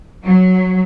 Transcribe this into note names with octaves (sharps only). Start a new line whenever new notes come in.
F#3